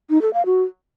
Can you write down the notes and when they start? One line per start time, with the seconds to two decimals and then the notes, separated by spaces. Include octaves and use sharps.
0.10 D#4
0.22 A4
0.34 F5
0.46 F#4